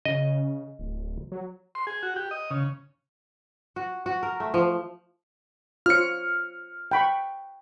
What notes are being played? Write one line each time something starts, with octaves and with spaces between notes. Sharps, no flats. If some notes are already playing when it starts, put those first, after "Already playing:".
C#3 D#5
D1
F#3
C6
G#4
F#4
G4
D#5
C#3
F#4
F#4
A#4
A3
F3
F4 C5 C#5 F6 C#7
G5 B5 C#6